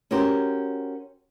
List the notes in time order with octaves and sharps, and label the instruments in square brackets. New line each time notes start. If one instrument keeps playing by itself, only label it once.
[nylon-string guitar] C#4 F#4 G4 A#4 C5